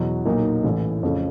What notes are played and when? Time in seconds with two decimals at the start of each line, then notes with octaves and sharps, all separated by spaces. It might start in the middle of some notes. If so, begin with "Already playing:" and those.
Already playing: E2 B2 F#3
0.26 B1 A#2 F#3 A#3 D#4
0.64 A1 A2 E3
1.03 F2 C#3 F3 A3 C#4